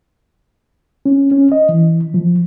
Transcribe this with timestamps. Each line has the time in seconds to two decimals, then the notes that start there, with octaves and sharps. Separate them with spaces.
1.06 C#4
1.32 C#4
1.52 D#5
1.69 E3
2.14 F3